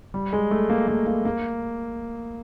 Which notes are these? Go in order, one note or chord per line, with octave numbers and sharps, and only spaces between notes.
G3
G#3
A3
A#3
A#3
A#3
A#3